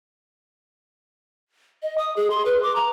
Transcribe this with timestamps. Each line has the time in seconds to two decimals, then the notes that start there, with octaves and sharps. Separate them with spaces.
1.83 D#5
1.98 D#6
2.16 G#4
2.30 C6
2.46 B4
2.63 D6
2.76 A#5